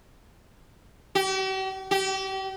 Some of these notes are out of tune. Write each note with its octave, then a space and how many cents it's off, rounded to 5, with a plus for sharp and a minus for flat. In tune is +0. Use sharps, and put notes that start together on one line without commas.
G4 -45
G4 -35